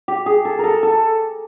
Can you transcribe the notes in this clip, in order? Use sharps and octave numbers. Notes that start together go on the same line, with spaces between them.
G4
G#4
A4
A4 A#4
A4